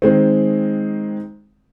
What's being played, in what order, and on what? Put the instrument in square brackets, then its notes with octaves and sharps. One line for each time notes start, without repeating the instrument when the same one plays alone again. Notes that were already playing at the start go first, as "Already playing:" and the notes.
[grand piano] D#3 G#3 C4